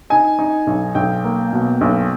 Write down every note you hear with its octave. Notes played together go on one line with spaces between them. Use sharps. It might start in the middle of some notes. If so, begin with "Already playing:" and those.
D#4 G#5
D#4
B1
B1 G5
A#3
B2
B1